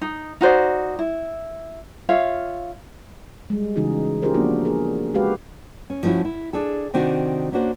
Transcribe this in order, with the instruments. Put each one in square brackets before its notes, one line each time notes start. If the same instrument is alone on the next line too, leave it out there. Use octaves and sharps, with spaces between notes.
[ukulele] D#4
D#4 F#4 C5 D5
E4
F4 C#5 E5 F5
[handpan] G3 G#3
C#3 E3 D#4 F#4 G#4
C#4 F4 G4 G#4 A#4 C5
F3 A#3 B3 D4 F4 F#4
G#4 A#4
G#3 F#4 G4 B4 F5
[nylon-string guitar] C#4
F3 A3 C#4 E4 F#4
E4
D4 G#4 A4
C3 D#3 C4 D4 D#4 F#4
A#3 C#4 D4 F#4 C5